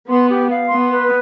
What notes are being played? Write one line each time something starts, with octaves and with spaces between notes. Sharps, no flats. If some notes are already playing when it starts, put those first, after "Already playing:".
B3 C6
G4
F5
B3 C6
B4